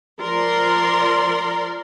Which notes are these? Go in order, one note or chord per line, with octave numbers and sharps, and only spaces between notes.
F3 A#4 D5 C6